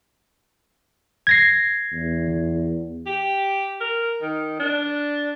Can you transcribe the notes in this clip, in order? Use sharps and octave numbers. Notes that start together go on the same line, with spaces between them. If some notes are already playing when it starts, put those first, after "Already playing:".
G#6 A#6 C7
E2
G4
A#4
D#3
D4